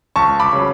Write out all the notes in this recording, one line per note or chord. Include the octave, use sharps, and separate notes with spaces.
C#2 A5 C#6
B5 D6
C#3 F#3